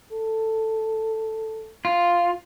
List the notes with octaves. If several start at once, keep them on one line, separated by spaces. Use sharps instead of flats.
A4
F4